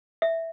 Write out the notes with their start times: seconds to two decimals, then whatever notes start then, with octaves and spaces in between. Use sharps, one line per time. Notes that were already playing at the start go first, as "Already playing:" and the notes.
0.22 E5